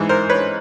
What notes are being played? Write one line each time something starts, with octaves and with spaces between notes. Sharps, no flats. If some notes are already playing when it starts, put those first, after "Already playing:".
Already playing: G#2 E3 G#3
A#4 C5
B4 C#5